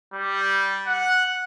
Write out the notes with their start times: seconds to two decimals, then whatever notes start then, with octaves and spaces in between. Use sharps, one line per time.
0.14 G3
0.87 F#5